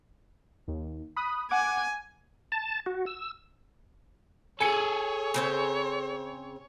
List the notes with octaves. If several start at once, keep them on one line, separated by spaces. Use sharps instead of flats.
D#2
B5 D#6 F#6
F#5 G#5 D6
A5
F#4
E6
G#4 A4 C#5 G#5 C#7
C#3 C4 C5